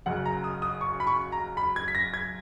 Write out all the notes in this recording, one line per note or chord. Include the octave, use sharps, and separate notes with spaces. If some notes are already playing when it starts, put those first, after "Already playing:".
F#1 F#2 C#3 F#5
A#5
D#6
D#6
C#6
B5
C#6
A#5
B5
G#6
B6
A#6
G#6